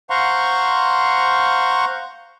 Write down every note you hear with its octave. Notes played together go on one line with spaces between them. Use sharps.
C5 F5 F#5 A#5 C6 C#6